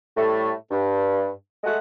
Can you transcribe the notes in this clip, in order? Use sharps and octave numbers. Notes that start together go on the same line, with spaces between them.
A2 G3 A3
G2
G#3 A3 A4 E5 F#5